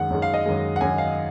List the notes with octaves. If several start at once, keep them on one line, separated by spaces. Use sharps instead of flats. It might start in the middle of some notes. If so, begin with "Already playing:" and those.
Already playing: F#2 D#3 G#3 F#5
F#2 D#3 G#3
F5
D#5
F#2 D#3 G#3
F#5
F#2 D#3 G#3 G#5
F5